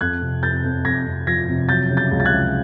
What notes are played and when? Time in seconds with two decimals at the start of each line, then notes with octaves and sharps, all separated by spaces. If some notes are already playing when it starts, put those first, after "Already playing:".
0.01 F2 F#6 G#6
0.22 C3
0.43 F2 G6 A6
0.64 F2
0.85 F2 G#6 A#6
1.06 F2
1.27 F3 G#6 A#6
1.48 C3
1.69 F#3 G6 A6
1.90 C#3
1.97 G6 A6
2.11 C#2
2.20 A6
2.25 F#6 G#6
2.32 C#3